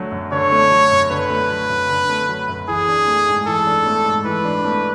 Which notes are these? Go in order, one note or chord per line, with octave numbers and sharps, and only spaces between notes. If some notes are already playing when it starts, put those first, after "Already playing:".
Already playing: D3 F#3 A3
F#2
D3 C#5
A3
F#3
F#2
D3 B4
A3
F#3
F#2
D3
A3
F#3
F#2
E3 G#4
D4
A3
G#2
E3 A4
D4
A3
G#2
E3 B4
D4
A3